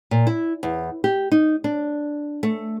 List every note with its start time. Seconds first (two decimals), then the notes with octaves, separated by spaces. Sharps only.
0.11 A#2
0.27 E4
0.63 E2
1.04 G4
1.32 D#4
1.64 D4
2.43 A3